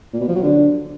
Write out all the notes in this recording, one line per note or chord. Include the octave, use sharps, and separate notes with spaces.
A#2
B2
F3
F#3
D3